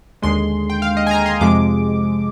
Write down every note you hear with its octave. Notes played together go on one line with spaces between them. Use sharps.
D#2 D3 G#3 C6
G5
F5
D#5
G#5
A#5
C6
F2 C3 F3 G#3 D6